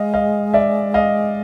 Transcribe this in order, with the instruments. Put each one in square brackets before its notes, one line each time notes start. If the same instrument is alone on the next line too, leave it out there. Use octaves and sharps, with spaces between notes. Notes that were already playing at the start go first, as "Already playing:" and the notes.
Already playing: [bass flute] G#3 [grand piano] D#5 F5
[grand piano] D#5 F5
D5 E5
D#5 F5